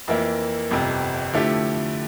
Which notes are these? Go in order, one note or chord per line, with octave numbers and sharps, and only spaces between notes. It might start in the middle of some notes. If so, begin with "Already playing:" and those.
F2 E3 A#3 E4
G1 F2 C3
D3 F3 A3 E4 G4